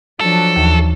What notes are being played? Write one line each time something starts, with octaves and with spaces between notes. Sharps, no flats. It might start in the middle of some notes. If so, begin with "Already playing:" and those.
F3 F#3 D4 A4
D#2 E3